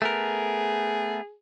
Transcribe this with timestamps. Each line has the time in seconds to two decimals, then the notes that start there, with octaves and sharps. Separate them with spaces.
0.02 A3 B3 G#4 A#4